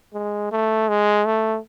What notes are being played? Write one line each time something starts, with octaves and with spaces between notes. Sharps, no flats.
G#3
A3
G#3
A3